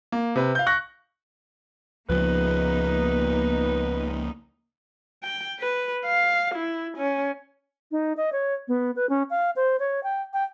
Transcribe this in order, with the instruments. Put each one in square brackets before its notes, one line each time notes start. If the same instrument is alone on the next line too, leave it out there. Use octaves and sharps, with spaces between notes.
[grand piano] A#3
C3 B4
F5 G6
C#6 F#6 A#6
[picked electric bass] C#2 F3 [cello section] A#3 B3 D#4 [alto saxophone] B4
[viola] G5
B4
F5
E4
C#4
[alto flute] D#4
D#5
C#5
B3
B4
C#4
F5
C5
C#5
G5
G5